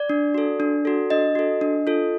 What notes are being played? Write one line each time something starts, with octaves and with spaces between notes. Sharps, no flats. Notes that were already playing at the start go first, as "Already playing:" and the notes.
Already playing: D5
D4
F#4 A4
D4
F#4 A4
D4 D#5
F#4 A4
D4
F4 A4